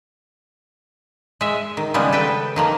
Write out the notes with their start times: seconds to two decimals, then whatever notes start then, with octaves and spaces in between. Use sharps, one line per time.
1.41 G#3 E5
1.77 D#3
1.94 C#3 G3 G#3 B3
2.13 A4 B4 G5
2.56 D#3 F3 A#3